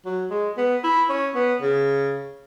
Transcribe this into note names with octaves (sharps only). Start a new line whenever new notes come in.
F#3
G#3
B3
E4
C#4
B3
C#3